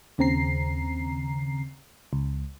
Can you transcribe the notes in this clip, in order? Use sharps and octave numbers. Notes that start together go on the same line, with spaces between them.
D#2 C#3 C4 A#5 C7
C#2